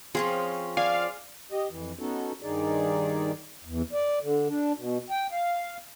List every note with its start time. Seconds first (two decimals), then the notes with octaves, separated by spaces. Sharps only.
0.15 F3 C4 C#4 G#4
0.77 D5 F5 G#5
1.52 G4 D#5
1.70 F2 E3
1.99 B3 C#4 D#4 F#4 A4
2.42 G2 D#3 D#4 G#4 D5
3.65 E2
3.93 D5
4.21 D3
4.48 D4
4.76 B2
5.10 G5
5.32 F5